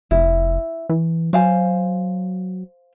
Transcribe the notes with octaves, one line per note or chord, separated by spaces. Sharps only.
F1 E4
E3
F#3 C5 F5 G#5